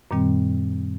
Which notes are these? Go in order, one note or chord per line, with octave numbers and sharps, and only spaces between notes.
F#2 A#2 D#3 G3 C4